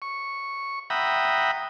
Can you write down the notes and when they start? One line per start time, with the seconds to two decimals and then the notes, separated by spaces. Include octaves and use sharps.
0.02 C#6
0.90 E5 F#5 G5 A#5 B5 D#6